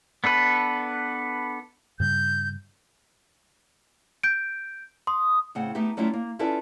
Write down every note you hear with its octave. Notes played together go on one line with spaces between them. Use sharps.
B3 D4 A4 B4
G2 C#3 G3 G6
G6 D7
C6 D#6
A2 C#3 C4 F#5
A3 B3 D#4 E4 G4
F#3 G3 A3 C#4 E4 F4
A#3
C#4 E4 F4 A4 B4 D5